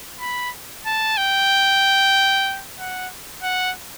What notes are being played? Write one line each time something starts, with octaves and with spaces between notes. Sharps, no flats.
B5
A5
G5
F#5
F#5